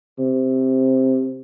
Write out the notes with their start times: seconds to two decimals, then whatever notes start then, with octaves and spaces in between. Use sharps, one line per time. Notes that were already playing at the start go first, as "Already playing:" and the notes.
0.19 C3